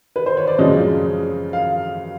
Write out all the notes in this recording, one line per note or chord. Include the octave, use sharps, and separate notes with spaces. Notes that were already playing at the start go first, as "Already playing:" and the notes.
B4
C5
C#5
D5
F#2 C#3 F3 G#3 D#5
F5